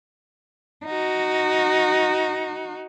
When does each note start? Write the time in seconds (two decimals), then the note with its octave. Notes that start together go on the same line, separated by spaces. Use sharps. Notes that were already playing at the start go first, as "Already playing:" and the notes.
0.86 D#4 F#4